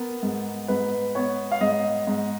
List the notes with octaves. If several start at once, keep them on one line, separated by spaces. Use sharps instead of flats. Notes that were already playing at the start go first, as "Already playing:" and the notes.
Already playing: B3 A#4
G#2
G#2 B4
B3 C#5
F5
G#2 D#5
G#2